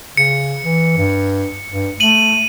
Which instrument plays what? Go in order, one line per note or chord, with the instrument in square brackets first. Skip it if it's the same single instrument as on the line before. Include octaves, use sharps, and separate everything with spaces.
[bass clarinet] C#3 [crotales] C#7
[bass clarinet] E3
G2
G2
[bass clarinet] A3 [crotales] D#7 F#7